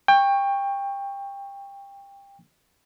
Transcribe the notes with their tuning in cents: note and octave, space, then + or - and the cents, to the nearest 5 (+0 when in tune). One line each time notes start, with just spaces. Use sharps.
G5 +25 C#6 +0